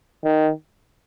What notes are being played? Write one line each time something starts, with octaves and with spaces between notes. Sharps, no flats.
D#3